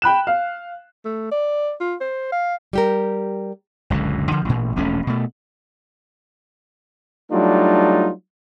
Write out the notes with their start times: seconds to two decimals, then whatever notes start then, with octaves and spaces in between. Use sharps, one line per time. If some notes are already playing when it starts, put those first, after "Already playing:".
0.02 G5 B5 F#6 E7
0.27 F5
1.05 A3
1.32 D5
1.81 F4
2.00 C5
2.32 F5
2.73 G3 G4 A#4
3.90 F#1 C#2 A#2 D3
4.31 D3 F3
4.45 A1 A#2
4.76 E1 A#1 A3 C#4
5.07 B2 A3
7.31 F#3 G3 A3 D4 D#4 F4